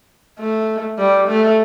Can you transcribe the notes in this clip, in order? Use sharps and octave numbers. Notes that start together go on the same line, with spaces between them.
A3
G3
A3